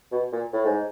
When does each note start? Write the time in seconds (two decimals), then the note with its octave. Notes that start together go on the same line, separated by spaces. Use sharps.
0.12 B2
0.32 A#2
0.53 A2
0.65 G#2